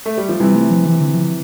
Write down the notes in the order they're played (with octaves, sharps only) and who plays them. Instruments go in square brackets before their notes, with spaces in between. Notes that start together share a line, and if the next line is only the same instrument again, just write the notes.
[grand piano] A3
G3
F3
[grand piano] C3 E3 [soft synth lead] G3
[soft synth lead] A3
F3
[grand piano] C3 [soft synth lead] E3
[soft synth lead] D3
F3